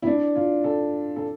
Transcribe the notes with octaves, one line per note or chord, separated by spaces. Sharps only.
E4
D4
F4
A4
A4